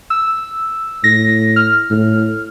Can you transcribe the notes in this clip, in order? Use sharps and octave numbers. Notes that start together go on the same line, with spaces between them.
E6
A2 A#6
F6
A2